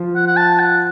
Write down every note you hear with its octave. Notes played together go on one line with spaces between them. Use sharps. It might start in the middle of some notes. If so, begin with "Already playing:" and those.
Already playing: F3 F4
F#5
F#5
A5
F#5